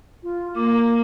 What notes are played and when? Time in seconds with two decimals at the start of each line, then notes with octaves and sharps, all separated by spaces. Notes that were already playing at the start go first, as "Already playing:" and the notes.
0.23 F4
0.56 A#3 D6